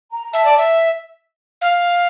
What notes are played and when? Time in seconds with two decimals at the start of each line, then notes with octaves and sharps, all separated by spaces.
0.12 A#5
0.33 E5 A5
0.45 D5
0.58 E5
1.61 F5